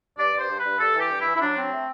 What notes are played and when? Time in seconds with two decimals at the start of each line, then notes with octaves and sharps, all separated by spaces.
0.18 G2 D5
0.33 G2
0.38 C5
0.48 G2
0.59 G2 B4
0.79 G2 A4
0.94 E3
1.00 G4
1.10 G2
1.20 E3 E4
1.35 E4
1.41 F#3 D4
1.56 C4
1.72 A3